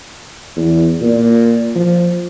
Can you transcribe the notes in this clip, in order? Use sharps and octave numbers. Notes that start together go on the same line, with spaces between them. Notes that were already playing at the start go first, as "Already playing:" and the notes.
E2
A#2
F3